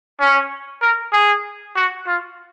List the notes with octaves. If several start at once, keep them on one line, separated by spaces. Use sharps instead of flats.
C#4
A#4
G#4
F#4
F4